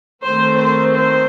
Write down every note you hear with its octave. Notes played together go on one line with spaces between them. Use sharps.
D#3 A3 C4 C5
C5
C5